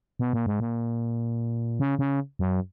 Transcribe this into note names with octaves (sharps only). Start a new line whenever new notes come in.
B2
A#2
G#2
A#2
C#3
C#3
F#2